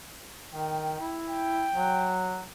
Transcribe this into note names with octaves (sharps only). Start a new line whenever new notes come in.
D#3 G5
E4
G5
F#3